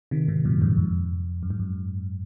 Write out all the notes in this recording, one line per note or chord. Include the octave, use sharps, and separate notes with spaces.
C3 D#3
G#2 C3
F#2 A#2
F2 G#2
F2
F#2
G#2
F#2